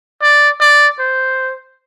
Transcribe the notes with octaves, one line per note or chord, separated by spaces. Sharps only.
D5
D5
C5